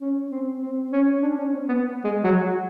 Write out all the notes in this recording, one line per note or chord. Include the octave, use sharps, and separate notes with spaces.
C#4
C4
C4
C#4
D4
C#4
C4
B3
G#3
F#3